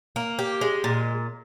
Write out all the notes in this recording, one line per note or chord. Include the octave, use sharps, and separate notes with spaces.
A#3
G4
G#3
A#2